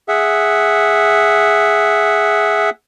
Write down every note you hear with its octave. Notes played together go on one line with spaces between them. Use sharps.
G#4 E5 F#5